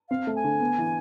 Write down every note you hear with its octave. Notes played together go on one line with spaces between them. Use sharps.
C4 F5
A3
G#5
D3
B3
E3